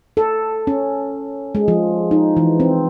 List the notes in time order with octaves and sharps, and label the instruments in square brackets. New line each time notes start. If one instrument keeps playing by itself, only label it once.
[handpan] A4
C#4
G#3
F3
D#4
E3
C4